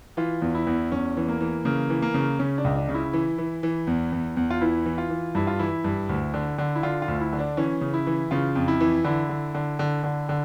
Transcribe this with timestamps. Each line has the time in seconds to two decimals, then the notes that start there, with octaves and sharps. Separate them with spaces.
0.17 E3 F4
0.42 E2
0.55 E4
0.67 E2
0.92 E2 C#4
1.17 E3
1.28 A#3
1.41 E3
1.65 C#3 A#3
1.90 E3
2.02 A#3
2.14 C#3
2.39 C#3 C#4
2.58 D4
2.64 C#2
2.76 D4
2.89 C#3
2.94 E4
3.13 E3
3.38 E3
3.63 E3
3.87 E2
4.12 E2
4.37 E2
4.50 F4
4.61 E3 E4
4.86 E3
4.98 F4
5.10 E3
5.35 G2 E4
5.47 F4
5.59 E3 E4
5.84 G2
6.09 D2
6.34 D3
6.58 D3
6.75 E4
6.83 D3 F4
7.02 F4
7.08 D2
7.20 E4
7.33 D3
7.39 D4
7.57 E3 C#4
7.81 C#3
7.94 E4
8.07 E3
8.31 C#3 F4
8.55 F2
8.68 E4
8.80 E3
9.05 D3 E4
9.29 D3
9.55 D3
9.79 D3
10.04 D3
10.29 D3